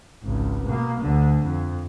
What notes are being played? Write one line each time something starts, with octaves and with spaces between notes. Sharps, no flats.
G#1 C#2
B2 A#3
D2 D3
F2